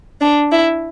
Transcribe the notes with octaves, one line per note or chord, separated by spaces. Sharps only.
D4
E4